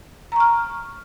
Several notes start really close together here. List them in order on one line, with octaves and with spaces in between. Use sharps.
A#5 C#6 F6